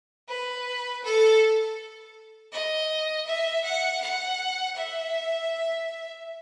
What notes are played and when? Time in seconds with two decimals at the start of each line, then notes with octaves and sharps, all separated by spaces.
0.28 B4
1.04 A4
2.52 D#5
3.26 E5
3.64 F#5
4.01 F#5
4.76 E5